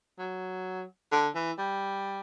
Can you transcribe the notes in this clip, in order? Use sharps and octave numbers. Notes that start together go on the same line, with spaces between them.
F#3
D3
E3
G3